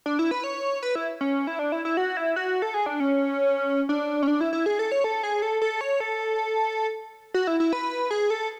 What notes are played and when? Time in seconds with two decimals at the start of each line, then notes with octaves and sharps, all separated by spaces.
0.06 D4
0.19 E4
0.31 B4
0.44 C#5
0.83 B4
0.95 E4
1.21 C#4
1.47 E4
1.59 D4
1.72 E4
1.85 E4
1.97 F#4
2.17 E4
2.36 F#4
2.62 A4
2.74 G#4
2.86 D4
3.00 C#4
3.89 D4
4.23 C#4
4.27 D4
4.41 E4
4.53 E4
4.66 G#4
4.79 A4
4.92 C#5
5.04 A4
5.23 G#4
5.42 A4
5.62 A4
5.81 C#5
6.00 A4
7.34 F#4
7.47 E4
7.60 E4
7.73 B4
8.11 G#4
8.30 A4